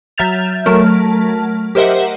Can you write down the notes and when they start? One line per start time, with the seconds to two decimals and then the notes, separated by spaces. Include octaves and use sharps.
0.18 F#3 E5 F6 G6 A6 F7
0.66 F#3 A3 A#4 A5 F6
1.75 G4 A#4 C5 D#5 E5 F#5